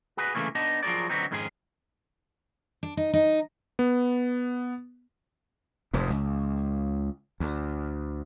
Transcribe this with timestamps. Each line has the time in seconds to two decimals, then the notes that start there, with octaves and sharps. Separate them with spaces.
0.17 F#4 G#4 B4
0.35 C2 C#3 E3 A3 A#3
0.55 B3 D4 D#4 D#5 A5
0.83 F3 F#3 D#4 G#4 A#4 D5
1.09 D3 F#3 B3 C4 D#4
1.31 F2 G#2 D#3 G#3 C#4 G#4
2.83 D4
2.97 D#4
3.14 D#4
3.79 B3
5.93 F1 F2 G#2
6.10 C#2
7.40 D2